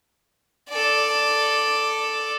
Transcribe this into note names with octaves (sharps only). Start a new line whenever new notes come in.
A4 D5